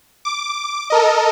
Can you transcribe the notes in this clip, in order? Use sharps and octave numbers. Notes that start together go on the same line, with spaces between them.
D6
A4 A#4 D#5